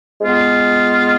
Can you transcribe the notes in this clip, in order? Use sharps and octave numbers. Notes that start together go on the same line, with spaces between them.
G#3 B3 F4